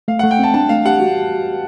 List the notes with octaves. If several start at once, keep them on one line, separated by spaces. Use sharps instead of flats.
A3 F5
F#5
A3
G5
C4 A5
D4 A5
A3 F5
G4 F#5
F#4